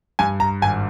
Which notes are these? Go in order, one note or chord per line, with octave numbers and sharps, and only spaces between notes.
G2 G#5
A#5
G#1 G#5